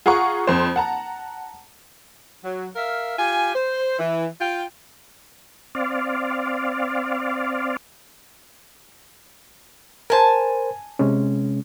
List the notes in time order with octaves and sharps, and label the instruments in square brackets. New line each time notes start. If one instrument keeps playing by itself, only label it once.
[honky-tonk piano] F4 G#4 F#5 A#5 C#6
F2 C5
F#5 A5 A#5
[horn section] F#3
A#4 E5 F5
F4 G4 G#5
C5
E3
F4 G5
[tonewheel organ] C4 D5 F5
[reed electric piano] A#4 C5 [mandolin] G#5 A5
[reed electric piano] C3 G#3 C#4